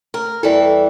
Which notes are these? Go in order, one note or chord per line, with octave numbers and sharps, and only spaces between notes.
A#4
E2 E3 G3 A4